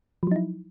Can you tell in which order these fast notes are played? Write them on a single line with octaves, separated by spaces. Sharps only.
F3 F#3 D#4 E4